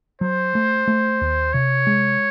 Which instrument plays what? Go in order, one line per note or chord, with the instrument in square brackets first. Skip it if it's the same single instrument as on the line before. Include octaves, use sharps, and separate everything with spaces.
[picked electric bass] F#3 [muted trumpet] C5
[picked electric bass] A3
A3
D#2
[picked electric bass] C3 [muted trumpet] C#5
[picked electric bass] G#3